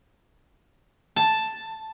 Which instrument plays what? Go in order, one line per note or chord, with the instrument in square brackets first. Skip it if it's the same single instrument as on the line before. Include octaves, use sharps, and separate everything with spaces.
[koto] A5